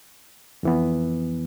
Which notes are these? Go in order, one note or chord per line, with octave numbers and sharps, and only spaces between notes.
F2 E3 B3